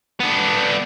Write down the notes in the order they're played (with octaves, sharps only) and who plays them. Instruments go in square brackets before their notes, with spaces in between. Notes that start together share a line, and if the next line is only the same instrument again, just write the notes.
[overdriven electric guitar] B3 D4